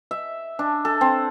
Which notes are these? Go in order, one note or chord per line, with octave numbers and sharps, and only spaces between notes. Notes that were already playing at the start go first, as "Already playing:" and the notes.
E5
D4
A4
C4